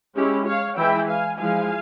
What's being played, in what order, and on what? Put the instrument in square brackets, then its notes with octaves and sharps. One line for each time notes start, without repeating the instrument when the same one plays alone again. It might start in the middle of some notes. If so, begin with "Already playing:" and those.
[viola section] G#3 C#4 E4 G4
C#5 F5
E3 G#3 E4 E5 G5
F5 G#5
F3 G#3 E4 F5 G#5